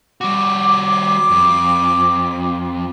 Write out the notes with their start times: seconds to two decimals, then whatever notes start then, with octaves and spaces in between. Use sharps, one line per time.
0.21 G3 F#4 D6
1.31 F2